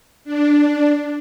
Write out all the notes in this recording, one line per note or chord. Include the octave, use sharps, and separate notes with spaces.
D4